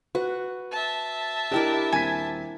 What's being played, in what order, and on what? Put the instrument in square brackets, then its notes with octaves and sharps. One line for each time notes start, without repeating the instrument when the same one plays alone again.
[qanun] F#4 [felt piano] B4
[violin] E5 A5
[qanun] D4 E4 A#4 [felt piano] G4 D#5 G5
[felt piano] D#1 C4 B6 [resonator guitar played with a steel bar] G#5